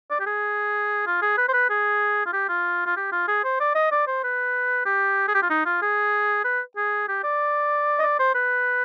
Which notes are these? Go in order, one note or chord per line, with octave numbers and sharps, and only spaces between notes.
D5
G4
G#4
F4
G#4
B4
C5
B4
G#4
F4
G4
F4
F4
G4
F4
G#4
C5
D5
D#5
D5
C5
B4
G4
G#4
G4
F4
D#4
F4
G#4
B4
G#4
G4
D5
D#5
D5
C5
B4